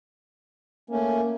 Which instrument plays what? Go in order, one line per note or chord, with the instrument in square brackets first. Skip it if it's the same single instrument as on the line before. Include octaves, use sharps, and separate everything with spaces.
[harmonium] A3 C#4 [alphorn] A#3